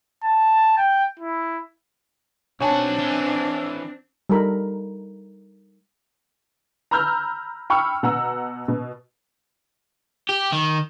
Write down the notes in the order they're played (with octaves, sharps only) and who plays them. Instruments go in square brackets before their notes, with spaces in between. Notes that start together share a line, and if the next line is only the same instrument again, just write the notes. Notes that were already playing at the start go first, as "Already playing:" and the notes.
[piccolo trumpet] A5
G5
E4
[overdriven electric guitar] B1 F#4 [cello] C4 D4 [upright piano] C#5 G#5 A5
[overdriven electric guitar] E3 C#4
[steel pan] G3 D#4 A4 A#4 B5
[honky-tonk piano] A#5 B5 E6 F6 G6
G5 B5 C#6 E6 F6
B2 F#5 A#5 E6
B2
[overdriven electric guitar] G4
D#3